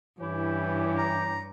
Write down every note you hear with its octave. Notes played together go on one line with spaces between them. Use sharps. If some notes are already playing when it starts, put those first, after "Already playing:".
G2 E3 C#4 E4 G4
A#5